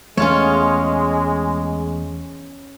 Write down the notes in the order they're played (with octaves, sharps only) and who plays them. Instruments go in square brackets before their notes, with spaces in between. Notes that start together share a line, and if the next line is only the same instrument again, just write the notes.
[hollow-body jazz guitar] E2 A3 [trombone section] G#3 [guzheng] C#4 F4 C#5